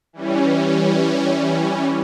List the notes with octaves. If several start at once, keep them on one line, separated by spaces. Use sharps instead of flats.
E3 G3 C#4